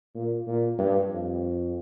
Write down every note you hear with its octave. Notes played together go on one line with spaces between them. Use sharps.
A#2
A#2
G2
F2